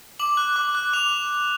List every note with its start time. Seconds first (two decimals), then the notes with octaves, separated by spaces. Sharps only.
0.19 D6 F#7
0.37 F#6
0.56 D6
0.75 F#6
0.93 D6 F7